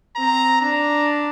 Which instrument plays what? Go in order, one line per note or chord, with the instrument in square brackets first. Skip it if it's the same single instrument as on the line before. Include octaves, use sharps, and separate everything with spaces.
[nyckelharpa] C4 [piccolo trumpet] A#5
[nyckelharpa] D4 [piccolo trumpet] A#5